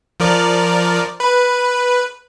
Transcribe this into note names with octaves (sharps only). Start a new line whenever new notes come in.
F3 A#4 D5
B4